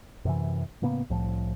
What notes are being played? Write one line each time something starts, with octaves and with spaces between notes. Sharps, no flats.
F#2 C3 E3
A2 C#3 A#3 B3
C2 A2 F3